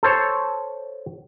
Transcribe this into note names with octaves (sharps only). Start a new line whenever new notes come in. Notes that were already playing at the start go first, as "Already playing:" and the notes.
A4 C5 C#5